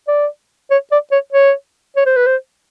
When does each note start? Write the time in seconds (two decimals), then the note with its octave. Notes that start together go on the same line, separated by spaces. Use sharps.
0.08 D5
0.71 C#5
0.92 D5
1.12 C#5
1.33 C#5
1.96 C#5
2.06 C5
2.17 B4
2.27 C5